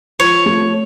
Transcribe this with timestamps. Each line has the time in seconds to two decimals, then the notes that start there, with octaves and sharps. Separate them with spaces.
0.19 F3 C#5
0.46 A3